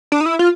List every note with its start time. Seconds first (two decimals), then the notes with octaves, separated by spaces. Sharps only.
0.12 D4
0.21 D#4
0.26 E4
0.39 F4